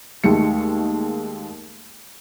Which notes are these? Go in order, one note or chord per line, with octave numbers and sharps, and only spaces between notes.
D#2 G#3 A3 C#7